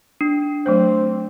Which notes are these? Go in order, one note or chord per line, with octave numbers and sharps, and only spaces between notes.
D4
F#3 A3 C4 C5